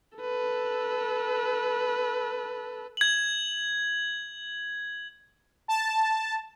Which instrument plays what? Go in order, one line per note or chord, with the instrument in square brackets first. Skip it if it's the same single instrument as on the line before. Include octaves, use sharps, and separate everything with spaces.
[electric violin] A4 B4
[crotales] G#6 F#7
[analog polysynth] A5